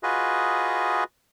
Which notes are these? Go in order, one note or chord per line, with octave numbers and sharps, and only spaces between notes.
F4 F#4 G#4 B4 D#5